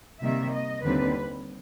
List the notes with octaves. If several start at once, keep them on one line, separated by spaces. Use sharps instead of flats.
C3 D#3 G3 A#3 E5
D#5
D#2 D3 G3 C4 B4